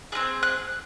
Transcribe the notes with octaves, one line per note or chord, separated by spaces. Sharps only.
C4 F4 G#4 F#6
F#6